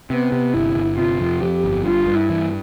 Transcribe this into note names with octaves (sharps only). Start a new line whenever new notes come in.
C3 B3
C3
G1 E4
G1
C3 F4
F2
F2 G4
G1
G2 F4
G2
E4
E3